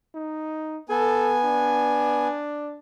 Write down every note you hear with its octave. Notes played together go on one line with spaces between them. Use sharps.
D#4
B3 A4 G#5
D4